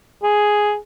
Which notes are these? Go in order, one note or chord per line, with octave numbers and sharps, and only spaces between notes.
G#4